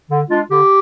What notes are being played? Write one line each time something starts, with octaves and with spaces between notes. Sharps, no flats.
D3
G#3 D4 F4
D3 G4